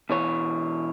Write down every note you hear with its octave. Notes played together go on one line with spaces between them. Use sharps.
B2 E3 C#5